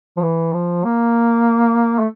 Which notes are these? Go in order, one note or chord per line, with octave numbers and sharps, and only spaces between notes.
F3
E3
F3
A#3
A3